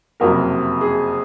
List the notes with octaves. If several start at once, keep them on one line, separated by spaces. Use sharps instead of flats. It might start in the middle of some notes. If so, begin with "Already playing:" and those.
F#1 F2 C3 F#3 A#4
G#4